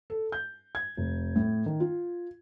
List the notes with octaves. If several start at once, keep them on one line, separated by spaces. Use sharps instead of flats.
A4
G6
G#6
F1
A2
D#3
F4